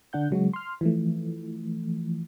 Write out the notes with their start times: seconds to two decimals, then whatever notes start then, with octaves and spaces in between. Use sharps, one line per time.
0.13 D3 D4 F#5 G6
0.31 C#3 F#3 G#3 F#4
0.53 C6 F6
0.81 E3 F3 A3